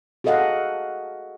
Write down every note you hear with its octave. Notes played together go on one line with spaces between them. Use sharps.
F#4 G#4 A4 D#5 F5 F#5